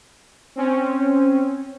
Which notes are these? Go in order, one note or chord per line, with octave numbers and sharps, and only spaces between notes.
C4 C#4